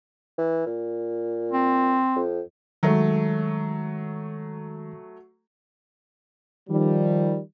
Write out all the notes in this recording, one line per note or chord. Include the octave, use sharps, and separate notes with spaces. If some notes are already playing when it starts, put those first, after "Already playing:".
E3
A#2
C4
F2
D#3 F#3 G#3 A3
D#3 F3 G3